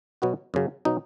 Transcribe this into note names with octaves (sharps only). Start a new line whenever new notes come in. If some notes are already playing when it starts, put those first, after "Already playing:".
B2 F#3 B3 F#4
F#2 C#3 F#3
B2 F#3 D#4